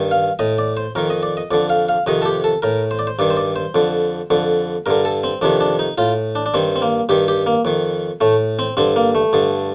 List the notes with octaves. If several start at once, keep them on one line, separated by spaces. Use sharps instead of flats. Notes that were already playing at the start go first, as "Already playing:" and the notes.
Already playing: G2 D#3
F5
A2 D#5
D5
C5
F2 D#3 A#4
D#5
D5
D#5
F2 D3 D5
F5
F5
F2 C3 D#3 D#5
A4
G4
A4
A2 A#4
C5
D5
C5
G2 D#3 D5
C5
D5
C5
F2 D3
F2 D3
G2 D3 A#4
A4
C4
F2 C3 D#3 D4
D4
D#4
A2 F4
D4
D4
G2 D#3 C4
C4
A#3
G2 D#3 G4
G4
A#3
F2 D#3
A2 A3
C4
G2 D3 C4
A#3
A3
G2 D3